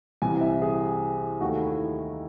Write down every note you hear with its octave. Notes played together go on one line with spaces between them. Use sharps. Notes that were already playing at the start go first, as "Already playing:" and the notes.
C2 C3 E3 G#5
E5
G#4
D#2 D#3 A3 F#4
E4